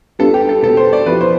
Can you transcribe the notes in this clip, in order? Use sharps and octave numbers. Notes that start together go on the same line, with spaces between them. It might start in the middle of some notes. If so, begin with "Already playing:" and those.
G3 B3 D4 F4 A4
G4
A4
B2 G3 B3 A4
C5
D5
F3 B3 E4 G4 B4
C5